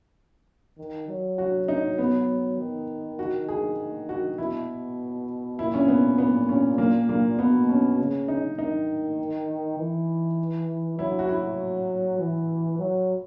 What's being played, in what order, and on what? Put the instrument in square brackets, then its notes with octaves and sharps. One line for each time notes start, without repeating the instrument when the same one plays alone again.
[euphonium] D#3
F#3
[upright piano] F#4
D#4
B3
[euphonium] D#3
[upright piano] F#4
G#4
F#4
[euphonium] B2 [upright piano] E4
[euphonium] A#2 [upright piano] E4
[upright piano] C#4
B3
B3
C#4
A#3
A#3
[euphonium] B2 [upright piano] B3
[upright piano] C#4
[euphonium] C#3
[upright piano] D#4
[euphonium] D#3 [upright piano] D#4
[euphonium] E3
[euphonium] F#3 [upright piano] E4
[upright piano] F#4
E4
[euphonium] E3
F#3